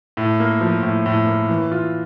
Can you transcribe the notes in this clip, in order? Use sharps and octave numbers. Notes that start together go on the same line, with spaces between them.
A2
A#3
F3
A2
A2
A#3
E3
F4